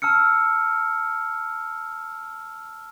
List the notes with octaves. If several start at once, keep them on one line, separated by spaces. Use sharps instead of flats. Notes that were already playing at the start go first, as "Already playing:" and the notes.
A5 E6 F6 C#7